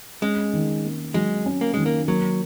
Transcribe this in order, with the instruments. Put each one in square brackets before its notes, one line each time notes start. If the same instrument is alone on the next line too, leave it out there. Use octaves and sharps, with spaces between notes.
[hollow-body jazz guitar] G#3 [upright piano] C#4
[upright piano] D#3
A#3
[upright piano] F#3 [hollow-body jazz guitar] G#3
[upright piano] C#4
[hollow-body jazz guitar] A#3
[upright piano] D#3 [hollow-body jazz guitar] G#3
[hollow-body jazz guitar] A#3
[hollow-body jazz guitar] F#3 [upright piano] A#3